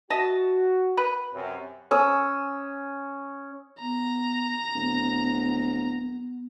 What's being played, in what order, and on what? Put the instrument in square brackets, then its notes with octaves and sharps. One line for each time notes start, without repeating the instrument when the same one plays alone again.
[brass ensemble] F#4 [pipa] D#5 E5 A5
[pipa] B4
[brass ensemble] F#2 C3
[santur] C#4 D#6 E6
[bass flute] B3 [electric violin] A#5
[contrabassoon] D1 [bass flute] B3